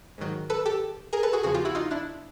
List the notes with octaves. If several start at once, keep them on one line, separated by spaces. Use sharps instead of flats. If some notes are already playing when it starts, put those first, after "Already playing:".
G#2 D#3 F#3
A4 B4
G4 A4
G#4 A#4
A4 B4
F#4 G#4
E2 C#3 F3 F#4 G#4
F4 G4
E4 F#4
D#4 F4
D4 E4